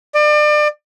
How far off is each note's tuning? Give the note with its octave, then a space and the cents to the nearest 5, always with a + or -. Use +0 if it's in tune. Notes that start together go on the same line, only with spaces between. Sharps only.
D5 +35